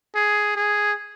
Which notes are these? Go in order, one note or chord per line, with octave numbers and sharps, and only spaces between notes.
G#4
G#4